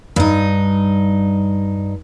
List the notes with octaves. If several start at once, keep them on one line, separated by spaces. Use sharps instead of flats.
G2 D#4